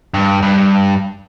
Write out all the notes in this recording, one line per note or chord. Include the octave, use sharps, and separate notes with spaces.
G2
G2